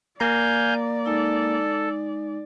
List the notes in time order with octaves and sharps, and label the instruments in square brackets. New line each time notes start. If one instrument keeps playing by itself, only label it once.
[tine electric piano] A#3 A#5 [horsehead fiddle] D5 [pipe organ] F5 G#5 G6
[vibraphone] G#3 D#4 [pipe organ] A4